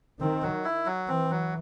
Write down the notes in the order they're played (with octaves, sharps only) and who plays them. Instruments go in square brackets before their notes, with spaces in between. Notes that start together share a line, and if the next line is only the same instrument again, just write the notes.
[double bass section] D#3 [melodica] C4
[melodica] F#3
E4
F#3
[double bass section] E3 [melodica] C4
[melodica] F#3